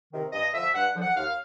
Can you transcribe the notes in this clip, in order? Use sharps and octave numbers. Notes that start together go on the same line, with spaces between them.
C3 D#3
G2 D#5
D3 F3 E5
G2 F#5
D3 F3
F#5
D#2 F5